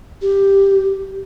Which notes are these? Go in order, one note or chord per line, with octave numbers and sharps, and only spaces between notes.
G4